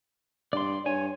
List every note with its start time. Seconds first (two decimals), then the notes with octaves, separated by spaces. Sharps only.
0.53 G2 D5 C6
0.86 G2 C#5 G#5